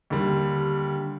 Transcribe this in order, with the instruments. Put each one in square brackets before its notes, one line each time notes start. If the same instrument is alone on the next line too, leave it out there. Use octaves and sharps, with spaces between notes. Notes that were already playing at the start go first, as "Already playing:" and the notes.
[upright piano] D#2 D3 G3